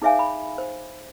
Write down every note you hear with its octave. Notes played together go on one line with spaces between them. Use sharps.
D#4 G#4 C#5 E5 F5 G#5
B5
C5